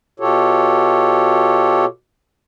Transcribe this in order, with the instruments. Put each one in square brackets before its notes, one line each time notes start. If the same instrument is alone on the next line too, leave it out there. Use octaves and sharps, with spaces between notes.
[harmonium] B2 F4 G4 A4 C#5